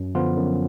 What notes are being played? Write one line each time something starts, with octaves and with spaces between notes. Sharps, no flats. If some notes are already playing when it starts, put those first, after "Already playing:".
Already playing: F#2
D3 F3 B3 F4
F#2